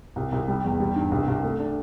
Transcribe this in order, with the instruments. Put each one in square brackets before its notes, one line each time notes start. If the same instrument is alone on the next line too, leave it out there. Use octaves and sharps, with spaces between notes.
[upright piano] C2
C2
G3
E2
G3
G2
C2
C2
A3
D4